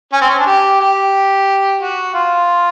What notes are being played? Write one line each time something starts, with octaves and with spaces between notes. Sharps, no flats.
C#4
C4
C#4
D4
G4
G4
F#4
F4